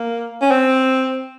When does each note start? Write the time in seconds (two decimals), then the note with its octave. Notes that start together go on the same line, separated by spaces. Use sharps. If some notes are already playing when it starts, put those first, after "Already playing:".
Already playing: A#3
0.42 C#4
0.51 C4